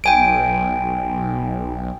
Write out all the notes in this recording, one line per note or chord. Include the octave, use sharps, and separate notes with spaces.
B1 G5 G#5 D7